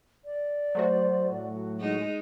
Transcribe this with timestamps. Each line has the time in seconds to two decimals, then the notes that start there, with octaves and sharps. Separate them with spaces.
0.25 D5
0.75 F#3 A3 F#4 C5
1.30 A2
1.80 G#3 D#4